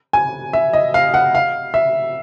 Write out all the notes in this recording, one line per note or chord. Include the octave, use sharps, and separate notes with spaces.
G#5
E5
D#5
F5
F#5
F5
E5